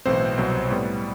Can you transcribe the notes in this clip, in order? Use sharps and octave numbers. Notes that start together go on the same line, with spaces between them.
B1 A2 E3 C4 C5
C2 B2 F#3 B3
A2 G3 B3